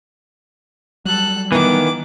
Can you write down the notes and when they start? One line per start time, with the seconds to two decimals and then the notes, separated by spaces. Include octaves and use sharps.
1.05 F#3 G3 A4 F#6
1.52 D#3 E3 B3 D6